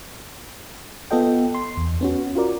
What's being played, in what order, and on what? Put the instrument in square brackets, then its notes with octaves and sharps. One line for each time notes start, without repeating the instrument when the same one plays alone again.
[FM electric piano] B3 F4 A4 D#5 G5
C6
E2
B3 C#4 F#4
F4 F#4 A#4 D5